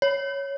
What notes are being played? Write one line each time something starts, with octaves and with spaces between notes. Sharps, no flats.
C#5